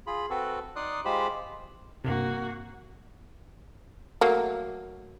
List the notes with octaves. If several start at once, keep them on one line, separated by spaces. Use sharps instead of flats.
F4 G#4 B5
C4 F#4 A4 B4
D#4 D5 C6 D#6 F#6
G#3 F4 G4 C5 B5
G2 C3 A#3 F#4
F#3 A3 A#3